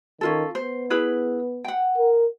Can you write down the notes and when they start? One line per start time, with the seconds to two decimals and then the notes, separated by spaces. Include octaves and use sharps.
0.21 D#3 C#4 F4 A4
0.55 B3 C5
0.90 E4 G#4 B4
1.64 F#5 G5
1.98 A#4